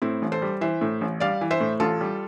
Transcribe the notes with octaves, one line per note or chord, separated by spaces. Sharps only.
A2 C4 E4
A1
A4 C5
G3
E3 C5 E5
A2
A1
G3 D5 F5
E3
C5 E5
A2
A1 F4 A4
G3